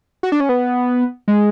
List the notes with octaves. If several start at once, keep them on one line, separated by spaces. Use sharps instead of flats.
F#4
D4
C#4
B3
G#3